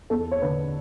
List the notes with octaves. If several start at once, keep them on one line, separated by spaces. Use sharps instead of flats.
E2 A4
C#5
D3 B4